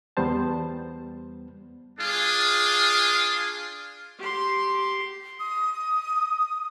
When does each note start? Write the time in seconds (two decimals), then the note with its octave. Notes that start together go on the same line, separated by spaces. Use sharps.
0.17 E2 G3 B3 C5 A5
2.00 D4 F4 G#4
4.19 G4 C6
5.40 D#6